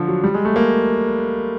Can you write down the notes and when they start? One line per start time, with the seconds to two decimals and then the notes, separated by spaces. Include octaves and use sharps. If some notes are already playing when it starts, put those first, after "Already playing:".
Already playing: D3 F3
0.08 F#3
0.24 G3
0.34 G#3
0.45 A3
0.56 A#3